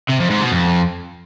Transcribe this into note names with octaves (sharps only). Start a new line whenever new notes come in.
C3
F2
G#2
B2
F2